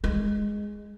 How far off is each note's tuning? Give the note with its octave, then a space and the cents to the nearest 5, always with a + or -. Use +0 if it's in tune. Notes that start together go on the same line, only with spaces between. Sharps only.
G#3 -5